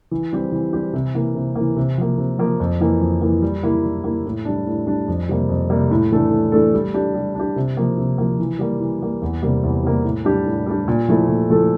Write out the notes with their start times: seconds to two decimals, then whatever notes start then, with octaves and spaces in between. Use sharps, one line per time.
0.11 E3
0.32 G3 C4 G4
0.52 E3
0.73 G3 C4 G4
0.93 C3
1.14 E3 A#3
1.35 C3
1.55 A#3
1.61 E3
1.76 C3
1.98 F3 A#3
2.18 C3
2.39 F3 A#3
2.60 F2
2.81 E3 A#3
3.01 F2
3.22 E3 A#3
3.42 G3
3.63 A#3 E4
3.84 G3
4.04 A#3 E4
4.26 A2
4.45 G3 D4
4.67 A2
4.87 G3 D4
5.08 F2
5.29 C3 G3 A#3
5.49 F2
5.70 C3 G3 A#3
5.91 A2
6.12 E3 A3 D4 A4
6.31 A2
6.52 E3 A3 D4 A4
6.74 G3
6.94 D4 G4
7.14 G3
7.35 D4 G4
7.56 C3
7.77 F3 A#3
7.97 C3
8.18 F3 A#3
8.39 E3
8.59 G3 A#3
8.80 E3
9.01 G3 A#3
9.22 E2
9.42 C3 G3 A#3
9.64 E2
9.83 C3 G3 A#3
10.04 A2
10.25 G3 D4 G4
10.46 A2
10.66 G3 D4 G4
10.88 A#2
11.08 F3 A3 E4 A4
11.28 A#2
11.50 F3 A3 E4 A4